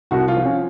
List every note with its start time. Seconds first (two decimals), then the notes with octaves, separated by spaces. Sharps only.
0.11 C2 F#4
0.28 F4
0.37 F3
0.45 C#4